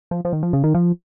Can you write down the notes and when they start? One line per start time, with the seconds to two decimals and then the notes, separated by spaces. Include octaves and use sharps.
0.11 F3
0.25 F3
0.33 D#3
0.43 F3
0.53 C#3
0.64 D#3
0.75 F3